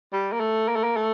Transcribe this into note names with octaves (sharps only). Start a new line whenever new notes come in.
G3
A#3
A3
A#3
A3
A#3
A3